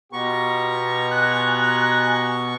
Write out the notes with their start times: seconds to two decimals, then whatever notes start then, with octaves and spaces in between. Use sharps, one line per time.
0.13 B2 B3 F4 G4 A#5 C#6
1.11 G#5 F#6